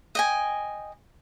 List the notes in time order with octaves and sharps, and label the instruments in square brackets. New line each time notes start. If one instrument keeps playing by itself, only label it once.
[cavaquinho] D#5 G5 G#5